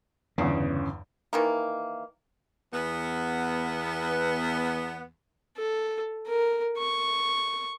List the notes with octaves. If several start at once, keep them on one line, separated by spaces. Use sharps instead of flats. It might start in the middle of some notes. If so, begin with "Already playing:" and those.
G1 E2 C#3
D#3 E3 A#3
E2 B3
A4
A#4
C#6